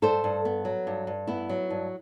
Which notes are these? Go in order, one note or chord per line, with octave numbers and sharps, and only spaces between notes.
G2 A4 C5
G2
B3
F#3
G2
G2
B3 E4
F#3
G2